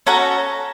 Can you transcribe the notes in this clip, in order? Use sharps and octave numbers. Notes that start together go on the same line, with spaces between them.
C#4 F#4 A4 A#5